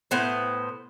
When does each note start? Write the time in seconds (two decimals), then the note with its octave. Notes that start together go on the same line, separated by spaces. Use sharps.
0.11 A2 B3 C5